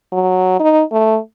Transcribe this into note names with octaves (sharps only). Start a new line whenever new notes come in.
F#3
D#4
A3